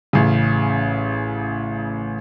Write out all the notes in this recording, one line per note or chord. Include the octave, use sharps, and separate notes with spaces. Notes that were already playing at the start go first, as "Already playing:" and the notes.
A1 C#3